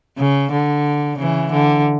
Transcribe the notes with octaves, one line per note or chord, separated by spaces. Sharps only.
C#3
D3
C#3 E3
D3